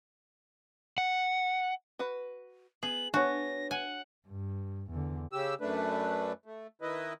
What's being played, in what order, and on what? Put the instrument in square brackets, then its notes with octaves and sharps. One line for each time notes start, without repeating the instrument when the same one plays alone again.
[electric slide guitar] F#5
[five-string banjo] F#4 B4
[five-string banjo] B3 [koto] G#4 [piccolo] F#7
[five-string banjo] B3 A5 [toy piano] D4 C#5 [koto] F#4 [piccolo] A#6
[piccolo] F#5 [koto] G#5
[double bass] G2
E2 D3
[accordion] C#3 G4 E6
F#2 A3 D4 B4
A3
D#3 E4 B4 D#5